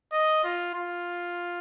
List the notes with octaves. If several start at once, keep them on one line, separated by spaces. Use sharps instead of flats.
D#5
F4
F4